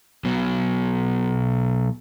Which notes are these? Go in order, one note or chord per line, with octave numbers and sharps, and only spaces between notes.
B1 B2